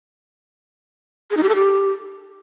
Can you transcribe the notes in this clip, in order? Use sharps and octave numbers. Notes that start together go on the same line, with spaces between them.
G#4
D#4
G4
A4
G4